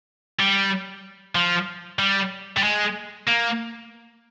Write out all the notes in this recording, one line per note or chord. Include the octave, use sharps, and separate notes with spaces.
G3
F3
G3
G3
G#3
A#3